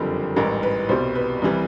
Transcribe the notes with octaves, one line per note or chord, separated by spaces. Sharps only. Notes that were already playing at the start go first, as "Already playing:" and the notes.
Already playing: F#1 F2 D3 G3 G4
A1 G#2 E3 G3 A#4
B4
C2 B2 G3 C5
B4
C2 C3 E3 G3